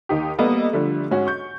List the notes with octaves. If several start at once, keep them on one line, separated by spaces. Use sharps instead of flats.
D#2 D#4 G4
G3 A#3 B3 A4 D#5
D3 F3 G3 A3
G#2 C#4 F#4
C#6 G6